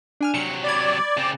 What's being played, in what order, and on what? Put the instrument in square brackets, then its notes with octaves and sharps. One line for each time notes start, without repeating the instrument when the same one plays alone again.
[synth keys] D4 G#5 F6
[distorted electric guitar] C3 F#3 [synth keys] C#7
[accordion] D5 [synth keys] B5 G#6
[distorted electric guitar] C#3 C4